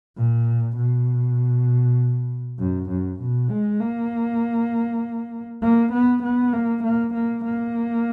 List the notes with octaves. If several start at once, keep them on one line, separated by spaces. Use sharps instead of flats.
A#2
B2
F#2
F#2
B2
G#3
A#3
A#3
B3
B3
A#3
A#3
A#3
A#3